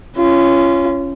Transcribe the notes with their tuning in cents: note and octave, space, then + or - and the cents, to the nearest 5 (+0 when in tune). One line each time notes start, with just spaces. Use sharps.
C#4 +0 F4 -35